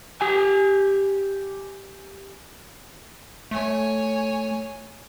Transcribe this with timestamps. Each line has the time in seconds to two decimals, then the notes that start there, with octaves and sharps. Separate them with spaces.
0.21 G4 G#5
3.51 A3 C#5 G#5